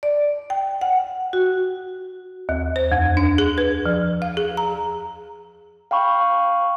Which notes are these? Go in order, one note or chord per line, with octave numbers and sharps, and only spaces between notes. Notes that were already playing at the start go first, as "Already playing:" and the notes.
D5
G5
F#5
F#4
D#2
C5
F2
D4
G#4
B4
F3
F5
G#4
A#5
F5 G5 B5 C#6